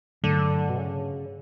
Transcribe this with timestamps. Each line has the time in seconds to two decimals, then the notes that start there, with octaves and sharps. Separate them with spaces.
0.24 G2 D3 F#3 A3 D4
0.69 B2
0.78 C#3